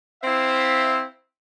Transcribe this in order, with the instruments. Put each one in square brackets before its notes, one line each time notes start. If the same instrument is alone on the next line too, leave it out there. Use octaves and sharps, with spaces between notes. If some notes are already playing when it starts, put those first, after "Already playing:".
[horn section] C4 E4 C5 E5 F5